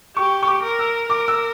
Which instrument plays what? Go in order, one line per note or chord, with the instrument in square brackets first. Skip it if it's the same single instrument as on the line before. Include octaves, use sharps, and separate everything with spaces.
[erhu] G4 [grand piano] C#6
[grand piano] C#6
D6
[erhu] A#4
[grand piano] E6
[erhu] A#4 [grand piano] D6
[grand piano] E6